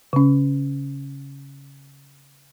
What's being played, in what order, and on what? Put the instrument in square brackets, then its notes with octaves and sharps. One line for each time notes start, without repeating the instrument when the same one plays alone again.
[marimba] C#3 C#4